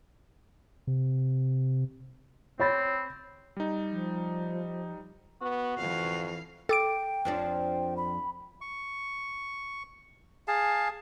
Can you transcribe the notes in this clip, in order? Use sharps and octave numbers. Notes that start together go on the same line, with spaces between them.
C3
C4 C#5 B5 A6
G3 D#4
F3
B3 F#4
F2 E3 F5
A4 G5 D6 D7
F2 F3 D4
B5
C#6
G#4 F5 A5